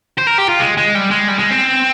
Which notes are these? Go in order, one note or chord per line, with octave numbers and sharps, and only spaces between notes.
C5
A#4
G4
F4
G#3
G#3
G3
G#3
G3
G#3
C4